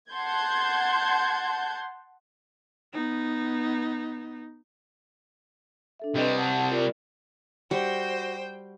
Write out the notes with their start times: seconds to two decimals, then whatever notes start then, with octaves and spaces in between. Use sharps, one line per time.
0.11 F#5 A5 C6 G6 G#6
2.93 B3 D#4
5.99 D4 A4 E5
6.14 C3 G3 B4 D#5 G5
6.37 F#5 A5
6.70 F4 A#4 D5
7.71 G3 F#4 C5 G5